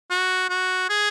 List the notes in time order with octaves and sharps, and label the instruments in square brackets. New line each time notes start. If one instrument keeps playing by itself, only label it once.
[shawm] F#4
F#4
G#4